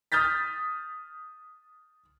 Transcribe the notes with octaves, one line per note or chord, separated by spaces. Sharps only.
D#6 F6 G6 A6 B6